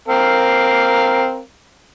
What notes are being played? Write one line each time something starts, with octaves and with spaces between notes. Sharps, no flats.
C4 A#4 F5